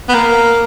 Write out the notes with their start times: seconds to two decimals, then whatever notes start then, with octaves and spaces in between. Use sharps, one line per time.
0.09 B3
0.14 A#3